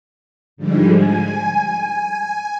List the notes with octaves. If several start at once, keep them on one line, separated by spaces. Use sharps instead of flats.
G#2 D3 F3 G3 G#3
G#5